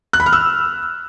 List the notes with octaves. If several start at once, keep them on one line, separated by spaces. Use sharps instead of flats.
F#6
B5
F6
E6